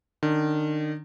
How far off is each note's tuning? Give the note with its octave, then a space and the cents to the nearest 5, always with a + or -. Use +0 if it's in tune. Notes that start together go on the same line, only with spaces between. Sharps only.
D#3 -35 D4 -25